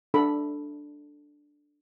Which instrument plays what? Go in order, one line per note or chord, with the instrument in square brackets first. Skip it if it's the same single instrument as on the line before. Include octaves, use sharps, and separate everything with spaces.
[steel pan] D4 A4 B5